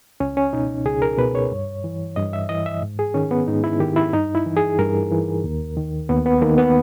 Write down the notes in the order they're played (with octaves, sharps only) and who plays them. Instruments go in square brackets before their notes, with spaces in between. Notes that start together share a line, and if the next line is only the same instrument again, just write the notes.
[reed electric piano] C#2 C#4
C#4
B2 D#4
C#2 G#4
A#4
B2 B4
C#5
G2
E3
G2 D#5
E5
E3 D#5
E5
G#2
G#4
D#3 C#4
B3
G#2 D#4
E4
D#3 G4
E4
G2 D#4
E4
E3
G#4
G2 A#4
E3
D#2
D#3
D#2 B3
B3
D#3 A#3
B3